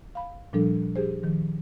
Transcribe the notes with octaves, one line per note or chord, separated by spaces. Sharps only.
F5 B5
A#2 F3 G3 D4 A4
G4 G#4 C5
D#3 F3